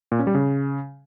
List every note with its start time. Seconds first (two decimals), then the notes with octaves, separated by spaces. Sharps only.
0.12 A#2
0.19 C#4
0.27 G3
0.35 C#3